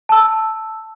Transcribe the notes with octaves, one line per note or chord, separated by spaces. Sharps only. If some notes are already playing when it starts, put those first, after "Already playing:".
A5 E6